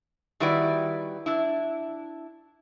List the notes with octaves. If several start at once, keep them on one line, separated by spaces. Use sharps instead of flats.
D#3 G3 E4 F#4 B4 D5
D4 E4